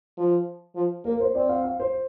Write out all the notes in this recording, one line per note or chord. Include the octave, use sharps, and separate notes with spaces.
F3
F3
A#3 A#4
C5
C4 D5
F5
F5
C5